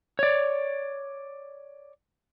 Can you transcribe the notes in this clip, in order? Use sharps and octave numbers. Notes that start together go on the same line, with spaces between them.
C#5 D5